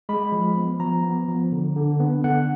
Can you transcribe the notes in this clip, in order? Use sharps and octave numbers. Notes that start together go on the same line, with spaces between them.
G#3 B5
F3
B3
F3 A#5
B3
F3
D3
D3
B3
D3 F#5